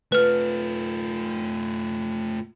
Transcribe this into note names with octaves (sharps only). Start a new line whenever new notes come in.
A3 F4 B4 F6